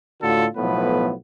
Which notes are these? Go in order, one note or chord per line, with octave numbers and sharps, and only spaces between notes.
A2 D3 F4 F#4 A4
B1 A2 F3 B3 B4